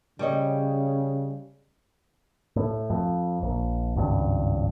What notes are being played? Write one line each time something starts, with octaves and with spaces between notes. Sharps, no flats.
C#3 G3 C#5 D#5
A2
F2
A#1
G#1 C#2 G2